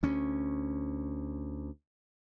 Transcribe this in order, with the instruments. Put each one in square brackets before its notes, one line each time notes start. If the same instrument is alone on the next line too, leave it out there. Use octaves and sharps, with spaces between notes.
[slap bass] D2 C#4